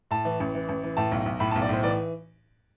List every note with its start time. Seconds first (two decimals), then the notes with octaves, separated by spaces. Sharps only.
0.11 A2 A5
0.25 E3
0.40 A1
0.55 E3
0.69 A1
0.83 E3
0.97 A2 A5
1.11 B1
1.25 B1
1.40 A2 B5
1.51 A5
1.55 B1
1.62 D5
1.69 A2 C5
1.83 E3 D5